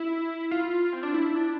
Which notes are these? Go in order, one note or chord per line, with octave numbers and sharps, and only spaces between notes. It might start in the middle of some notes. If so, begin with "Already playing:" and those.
Already playing: E4
F4
C4
D4
E4
D4